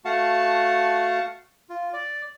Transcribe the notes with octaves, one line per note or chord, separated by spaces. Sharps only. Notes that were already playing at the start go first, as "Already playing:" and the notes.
A3 F#4 F5 F#5 A5
F4
D5